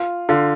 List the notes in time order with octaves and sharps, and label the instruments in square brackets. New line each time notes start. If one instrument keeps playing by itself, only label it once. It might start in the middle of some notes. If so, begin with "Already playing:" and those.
Already playing: [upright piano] F4
[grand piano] D3 [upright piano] F4